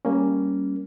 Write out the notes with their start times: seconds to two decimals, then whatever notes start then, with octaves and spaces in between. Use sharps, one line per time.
0.05 G3 A#3 C#4